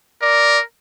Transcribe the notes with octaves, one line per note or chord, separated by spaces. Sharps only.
A#4 D5